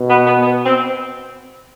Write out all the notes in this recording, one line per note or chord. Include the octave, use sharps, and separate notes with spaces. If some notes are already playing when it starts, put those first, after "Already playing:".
Already playing: B2
B3
B3
B3
C4